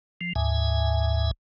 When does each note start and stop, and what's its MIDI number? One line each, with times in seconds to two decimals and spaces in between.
0.21 0.33 53
0.36 1.31 38
0.36 1.31 44
0.36 1.31 76
0.36 1.31 80